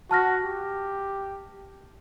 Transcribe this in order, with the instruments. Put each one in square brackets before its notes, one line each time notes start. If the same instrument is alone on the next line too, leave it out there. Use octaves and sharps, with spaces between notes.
[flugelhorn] F#4 [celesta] A5 F6 A#6
[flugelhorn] G4